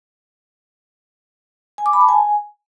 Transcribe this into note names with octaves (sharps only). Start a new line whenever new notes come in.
G#5
D6
B5
A5
G#5